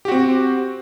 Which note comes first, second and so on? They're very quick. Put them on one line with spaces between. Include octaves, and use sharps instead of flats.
G4 F#4 C4